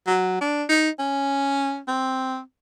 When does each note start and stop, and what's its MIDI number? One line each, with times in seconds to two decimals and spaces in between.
0.07 0.38 54
0.41 0.63 62
0.69 0.89 63
0.99 1.79 61
1.88 2.40 60